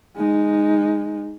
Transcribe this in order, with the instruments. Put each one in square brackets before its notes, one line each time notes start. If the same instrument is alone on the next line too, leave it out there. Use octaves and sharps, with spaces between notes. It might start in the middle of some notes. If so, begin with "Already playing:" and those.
[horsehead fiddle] G#3 D#4